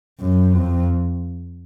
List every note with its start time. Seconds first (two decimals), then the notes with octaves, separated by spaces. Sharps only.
0.20 F#2
0.53 F2